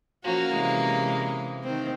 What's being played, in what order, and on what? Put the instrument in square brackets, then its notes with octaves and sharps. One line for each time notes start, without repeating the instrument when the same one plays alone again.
[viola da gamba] F3 F#4 [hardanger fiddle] A#3 C#4
[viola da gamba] C3 E3 G#3
D#3 C4